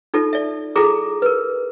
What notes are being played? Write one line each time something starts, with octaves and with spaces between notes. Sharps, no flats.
D#4 F4 A4 A5
D5 E5
E4 F4 G#4 A4 A#5 D6
A#4 B4